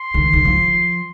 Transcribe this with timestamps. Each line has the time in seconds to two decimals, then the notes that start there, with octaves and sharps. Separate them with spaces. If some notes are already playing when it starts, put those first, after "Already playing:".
Already playing: C6
0.14 D#3
0.33 D#3
0.45 F3